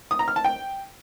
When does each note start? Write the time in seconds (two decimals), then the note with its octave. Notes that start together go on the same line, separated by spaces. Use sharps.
0.11 D#6
0.19 A#5
0.28 F6
0.36 A5
0.45 G5